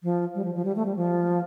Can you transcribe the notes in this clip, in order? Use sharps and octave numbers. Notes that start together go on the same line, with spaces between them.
F3
G3
F3
F3
G3
A3
G3
F3